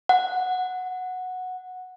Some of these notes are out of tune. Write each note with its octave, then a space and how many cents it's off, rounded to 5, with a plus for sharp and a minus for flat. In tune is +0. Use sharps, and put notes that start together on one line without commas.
F#5 -5